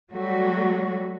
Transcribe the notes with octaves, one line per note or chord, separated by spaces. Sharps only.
F#3 G3 A3 F#4